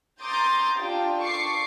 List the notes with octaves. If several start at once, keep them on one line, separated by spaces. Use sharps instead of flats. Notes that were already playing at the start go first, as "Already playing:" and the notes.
A#5 C6 D6 D#6 G6 A6
D4 F4 G4 G5
A4 C#6 D6 C7